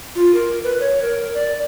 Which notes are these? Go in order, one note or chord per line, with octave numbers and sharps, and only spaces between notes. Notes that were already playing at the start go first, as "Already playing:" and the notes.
F4
A#4
B4
C#5
A#4
D5